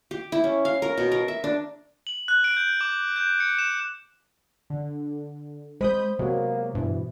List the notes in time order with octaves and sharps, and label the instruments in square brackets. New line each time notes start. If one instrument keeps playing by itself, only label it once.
[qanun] G4
E4
C#4
F5
A#4
B2
A#4
E5
D4
[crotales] F#7
F#6
D7
G6
D6
G6
C#7
E7
[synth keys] D3
[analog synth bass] G#3 [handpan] C5 [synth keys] B5 D#6 G6
[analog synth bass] C3 [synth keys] F#3 G#3 B3 [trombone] A#3
[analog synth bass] G2 [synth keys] B2 [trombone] E3